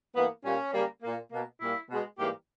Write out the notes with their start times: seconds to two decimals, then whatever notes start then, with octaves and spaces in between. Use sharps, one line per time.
0.15 G2 E3 A#3 B3
0.44 A#2 G3 A#3 C#4
0.73 C#3 G3 A#3
1.02 A#2 A#3
1.31 B2 A#3
1.60 A#2 G3 A#3 E4
1.89 B2 G#3
2.18 G#2 E3 G3 A#3 G4